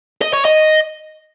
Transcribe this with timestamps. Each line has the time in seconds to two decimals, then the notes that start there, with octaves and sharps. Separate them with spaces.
0.21 D#5
0.33 C#5
0.45 D#5